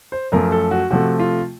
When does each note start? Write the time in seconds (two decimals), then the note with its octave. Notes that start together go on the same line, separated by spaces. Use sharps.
0.12 C5
0.32 F#2 F3 A3 A#4
0.52 A4
0.71 F#4
0.90 C3 F3 A3 F#4
1.19 F4